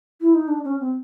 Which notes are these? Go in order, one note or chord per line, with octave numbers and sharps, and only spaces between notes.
E4
D#4
D4
C#4
C4